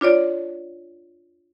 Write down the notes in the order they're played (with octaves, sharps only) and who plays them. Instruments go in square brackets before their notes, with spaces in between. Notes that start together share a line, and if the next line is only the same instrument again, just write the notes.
[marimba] D4 F4 C#5 D5